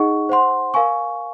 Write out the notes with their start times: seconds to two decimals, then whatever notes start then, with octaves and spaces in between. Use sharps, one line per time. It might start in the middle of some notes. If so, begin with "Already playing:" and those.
Already playing: D#4 G#4 D#5 F#5 C#6
0.29 C5 F#5 C6
0.74 A#4 F5 G#5 C#6